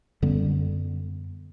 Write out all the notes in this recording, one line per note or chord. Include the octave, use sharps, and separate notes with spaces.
F#2 D3 G3 B3